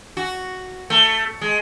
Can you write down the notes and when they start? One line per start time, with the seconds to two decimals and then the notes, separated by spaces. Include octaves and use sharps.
0.17 F#4
0.90 A3
1.41 G#3